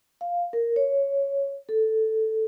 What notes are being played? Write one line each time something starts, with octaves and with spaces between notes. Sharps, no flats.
F5
A#4
C#5
A4